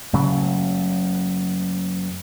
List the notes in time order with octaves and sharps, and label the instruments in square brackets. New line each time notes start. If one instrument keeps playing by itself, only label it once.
[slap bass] F#1 C#3 F#3 A3